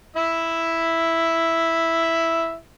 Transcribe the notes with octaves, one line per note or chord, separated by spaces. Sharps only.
E4 E5